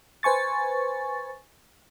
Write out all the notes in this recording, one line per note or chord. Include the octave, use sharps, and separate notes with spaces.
B4 C5 G#5 C#6 A6